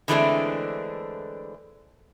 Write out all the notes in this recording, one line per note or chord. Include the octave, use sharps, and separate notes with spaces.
D3 E3 G#3 A3 C4 D4